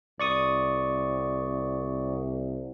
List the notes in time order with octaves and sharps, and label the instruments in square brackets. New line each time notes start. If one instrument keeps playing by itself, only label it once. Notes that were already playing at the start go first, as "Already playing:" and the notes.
[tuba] C2 [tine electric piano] D5 C#6 D#6